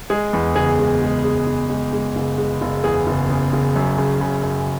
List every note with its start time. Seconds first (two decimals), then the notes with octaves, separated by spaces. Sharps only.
0.10 G#3 G#4
0.33 E2
0.56 F#1 G#4
0.79 G#3
1.02 G#3
1.24 G#3
1.47 F#1
1.70 G#3
1.93 G#3
2.16 F#1
2.38 G#3
2.61 F#1
2.84 E2 G#4
3.07 F#1
3.30 C#3
3.53 F#1
3.76 F#2
3.98 C#3
4.21 C#3
4.44 F#2